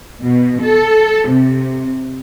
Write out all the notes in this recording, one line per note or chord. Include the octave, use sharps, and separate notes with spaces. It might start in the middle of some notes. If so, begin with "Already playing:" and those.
B2
A4
C3